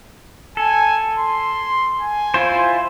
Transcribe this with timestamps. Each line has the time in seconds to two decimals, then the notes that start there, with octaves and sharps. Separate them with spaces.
0.57 A4 G#5
1.19 C6
2.01 G#5
2.34 E4 F4 C5